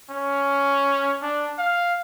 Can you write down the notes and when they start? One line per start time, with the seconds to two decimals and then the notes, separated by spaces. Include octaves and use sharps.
0.10 C#4
1.22 D4
1.58 F5